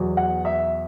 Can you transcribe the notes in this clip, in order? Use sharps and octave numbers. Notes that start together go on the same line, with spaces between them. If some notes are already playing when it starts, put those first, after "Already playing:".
Already playing: E2 B2 F#3
F#5
E5